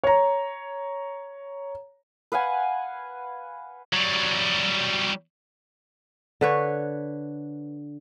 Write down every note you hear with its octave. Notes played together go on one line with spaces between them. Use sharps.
C#5 A#5
B4 F5 F#5 G#5
F#3 G3
D3 B4 C#5